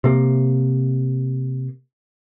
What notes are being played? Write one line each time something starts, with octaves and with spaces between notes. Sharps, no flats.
C3 A#3